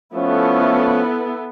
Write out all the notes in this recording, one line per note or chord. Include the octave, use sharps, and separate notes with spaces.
F3 A3 B3 C#4 E4 A4